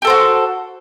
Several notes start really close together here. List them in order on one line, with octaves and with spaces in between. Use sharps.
G4 A4 C5 F#4